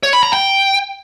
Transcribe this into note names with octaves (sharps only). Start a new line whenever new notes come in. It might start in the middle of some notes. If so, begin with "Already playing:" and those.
C#5
B5
A#5
G5